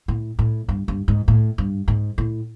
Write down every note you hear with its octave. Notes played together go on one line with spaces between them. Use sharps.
A2
A2
G2
G2
G#2
A2
G2
G#2
A2